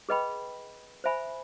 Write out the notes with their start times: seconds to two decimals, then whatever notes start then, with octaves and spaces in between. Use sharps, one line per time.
0.09 G#4 B4 D#5 G5 B5
1.04 C5 E5 G#5 B5